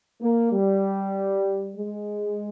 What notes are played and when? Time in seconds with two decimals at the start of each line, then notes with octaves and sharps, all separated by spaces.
0.21 A#3
0.52 G3
1.76 G#3